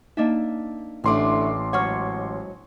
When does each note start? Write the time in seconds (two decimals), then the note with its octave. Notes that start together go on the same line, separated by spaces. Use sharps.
0.17 A#3 D4 D#4 D#5 E5
1.04 A1 A2 D3 A3 C6 D6
1.73 G#2 F#3 C#5 F#5 C#6 F6